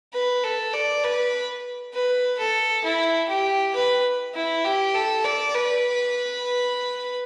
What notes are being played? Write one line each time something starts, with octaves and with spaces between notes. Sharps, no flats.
B4
A4
D5
B4
B4
A4
E4
G4
B4
E4
G4
A4
D5
B4